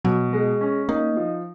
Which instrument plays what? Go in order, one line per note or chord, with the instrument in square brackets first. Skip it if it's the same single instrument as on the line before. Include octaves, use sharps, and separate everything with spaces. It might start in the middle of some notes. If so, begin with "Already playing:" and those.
[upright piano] B2 [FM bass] F#3
[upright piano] G#3
C#4
[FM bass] A#3 [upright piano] D#4
[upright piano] F3